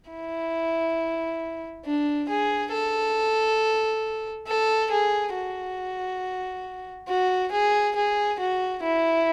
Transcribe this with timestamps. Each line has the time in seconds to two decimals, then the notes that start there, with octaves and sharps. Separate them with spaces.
0.10 E4
1.85 D4
2.29 G#4
2.72 A4
4.47 A4
4.91 G#4
5.34 F#4
7.09 F#4
7.52 G#4
7.96 G#4
8.40 F#4
8.83 E4